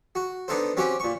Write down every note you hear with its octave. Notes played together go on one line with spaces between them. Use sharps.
F#4
B3 D4 D#4 A4 C5
C4 C#4 F#4 G4 C5
A#2 C#6